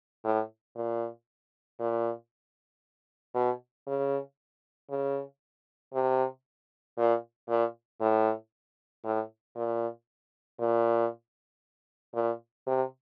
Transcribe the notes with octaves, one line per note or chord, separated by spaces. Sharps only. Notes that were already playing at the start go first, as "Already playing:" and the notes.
A2
A#2
A#2
B2
C#3
C#3
C3
A#2
A#2
A2
A2
A#2
A#2
A#2
C3